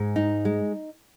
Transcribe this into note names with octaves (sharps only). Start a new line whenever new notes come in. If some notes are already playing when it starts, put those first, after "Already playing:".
Already playing: G#2 G#3
D#4
G#3